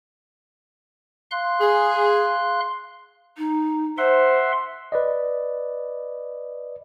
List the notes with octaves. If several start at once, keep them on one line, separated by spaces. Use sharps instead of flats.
F5 C6 F#6
G#4
D#4
C5 E5 F#5 C6
B4 D5 D#5